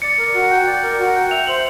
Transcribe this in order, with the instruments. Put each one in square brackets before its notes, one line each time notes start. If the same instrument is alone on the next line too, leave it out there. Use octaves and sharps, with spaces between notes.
[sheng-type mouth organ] D5 [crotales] C#7
[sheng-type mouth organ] A#4
F#4
G5
D5
A#4
F#4
G5
[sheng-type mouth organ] E5 [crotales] F7
[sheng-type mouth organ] C5 [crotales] F#7